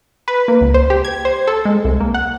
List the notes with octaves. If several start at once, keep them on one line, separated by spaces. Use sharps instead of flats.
B4
A#3
C#2
C5
G4
G#6
C5
A4
G#3
C2
A#3
F#5